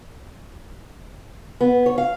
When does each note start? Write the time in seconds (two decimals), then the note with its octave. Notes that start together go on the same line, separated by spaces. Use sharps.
1.61 B3
1.86 C#5
1.98 F5